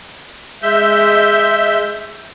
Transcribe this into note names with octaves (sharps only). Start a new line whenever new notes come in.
G#3 E5 G6